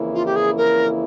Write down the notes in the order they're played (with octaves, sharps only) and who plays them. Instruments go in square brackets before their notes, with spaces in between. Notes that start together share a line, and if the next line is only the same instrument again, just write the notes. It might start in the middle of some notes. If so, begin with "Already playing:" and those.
Already playing: [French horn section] F2 C#3 E3 A#3 E4
[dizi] F4
G4
G#4
A#4